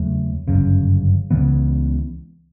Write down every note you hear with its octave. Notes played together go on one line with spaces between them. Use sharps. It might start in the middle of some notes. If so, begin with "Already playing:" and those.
Already playing: E2 C#3 F#3 A3
G1 F#2 C#3
C#2 C#3 E3 B3